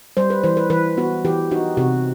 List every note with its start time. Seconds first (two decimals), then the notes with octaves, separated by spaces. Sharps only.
0.17 G3 C5
0.30 B4
0.44 E3 C5
0.57 B4
0.70 E3 B4
0.97 B3 F#4
1.25 E3 G4
1.51 D#4 F#4
1.77 C3 F#4